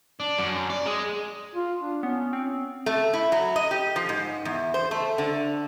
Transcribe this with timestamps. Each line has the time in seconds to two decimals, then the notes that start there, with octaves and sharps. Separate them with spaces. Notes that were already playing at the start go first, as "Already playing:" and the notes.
0.20 D4
0.39 F#2
0.70 D5
0.86 G#3
1.55 F4
1.81 D4
2.03 B3 C#4
2.33 C4
2.86 A3
3.14 E4
3.32 F#3
3.56 D#5
3.71 G4
3.96 F3
4.09 G#2
4.45 E2
4.74 C5
4.91 A3
5.18 D3